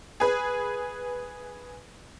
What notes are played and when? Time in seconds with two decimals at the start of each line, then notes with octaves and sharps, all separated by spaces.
0.20 G#4 B4